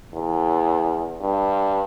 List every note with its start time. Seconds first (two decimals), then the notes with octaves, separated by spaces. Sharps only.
0.14 E2
1.21 G2